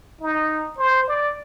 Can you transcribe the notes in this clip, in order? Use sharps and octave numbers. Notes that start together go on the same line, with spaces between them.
D#4
C5
D5